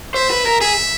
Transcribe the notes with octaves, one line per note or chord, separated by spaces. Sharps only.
C5 E5
B4
A#4
G#4 E5